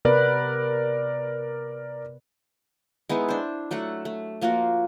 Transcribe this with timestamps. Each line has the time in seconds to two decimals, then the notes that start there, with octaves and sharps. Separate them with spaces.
0.05 C3 B3 A#4 B4 D5
3.09 G#3 B3 D#4 E4
3.29 D4 C5
3.71 F#3 A3 A4 F#5
4.05 A3
4.41 F3 A#3 F4 F#4